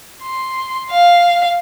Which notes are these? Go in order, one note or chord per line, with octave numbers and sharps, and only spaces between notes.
C6
F5